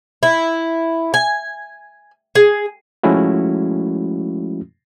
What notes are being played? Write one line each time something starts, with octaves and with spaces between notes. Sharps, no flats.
E4
G#5
G#4
F3 G#3 A3 C#4 E4 F#4